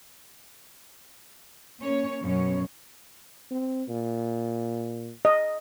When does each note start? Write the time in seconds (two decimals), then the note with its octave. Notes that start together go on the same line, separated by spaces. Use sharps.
1.80 A#3 C#4 C#5
2.22 F#2 B2 C#4 C#5
3.51 C4
3.89 A#2
5.25 D#5